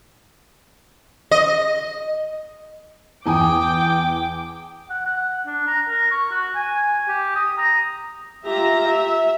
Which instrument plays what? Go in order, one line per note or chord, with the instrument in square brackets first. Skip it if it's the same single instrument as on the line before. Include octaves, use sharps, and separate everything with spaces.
[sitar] D#5
[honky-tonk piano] E2 G#5 D#6 [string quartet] G5 D6
[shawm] F#5
F#5
D4
A#5
A#4
C#6
F#4
G#5
G4
D#6
A#5
[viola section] F4 G4 E5 A#5
E5